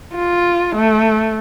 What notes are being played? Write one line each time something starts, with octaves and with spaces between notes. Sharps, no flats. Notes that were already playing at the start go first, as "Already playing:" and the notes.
F4
A3